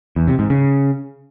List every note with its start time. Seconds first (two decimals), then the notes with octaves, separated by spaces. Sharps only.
0.16 E2
0.28 C3
0.39 G#2
0.50 C#3